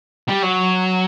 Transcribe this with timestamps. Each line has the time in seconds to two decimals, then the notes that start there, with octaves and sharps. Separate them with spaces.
0.28 G3
0.42 F#3